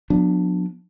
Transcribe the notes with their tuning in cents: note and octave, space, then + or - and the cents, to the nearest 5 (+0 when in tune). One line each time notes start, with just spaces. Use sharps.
F#3 -45 B3 +0 D4 +0